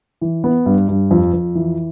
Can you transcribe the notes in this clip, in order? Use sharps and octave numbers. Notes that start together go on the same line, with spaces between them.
E3
B3
G2
G2
F2
F2
E3